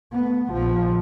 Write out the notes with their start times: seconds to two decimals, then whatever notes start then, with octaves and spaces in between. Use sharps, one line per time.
0.12 A3 B3
0.51 A#1 F3